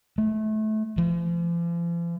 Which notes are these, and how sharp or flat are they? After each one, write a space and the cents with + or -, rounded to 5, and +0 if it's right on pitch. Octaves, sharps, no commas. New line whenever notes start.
A3 -25
F3 -45